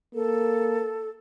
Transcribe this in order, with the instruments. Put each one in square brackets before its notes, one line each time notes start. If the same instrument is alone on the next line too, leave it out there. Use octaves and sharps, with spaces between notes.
[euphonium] A#3 [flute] A4